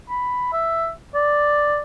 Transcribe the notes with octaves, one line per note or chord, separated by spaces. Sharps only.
B5
E5
D5